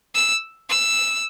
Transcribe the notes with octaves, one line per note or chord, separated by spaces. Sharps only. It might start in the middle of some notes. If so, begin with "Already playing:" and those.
E6
E6